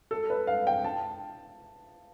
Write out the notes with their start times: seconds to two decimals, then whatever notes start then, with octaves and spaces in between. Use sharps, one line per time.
0.11 A4
0.30 B4
0.47 F5
0.67 G5
0.84 A5